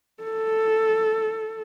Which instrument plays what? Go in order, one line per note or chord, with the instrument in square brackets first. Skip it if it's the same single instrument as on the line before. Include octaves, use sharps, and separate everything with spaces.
[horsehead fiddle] A4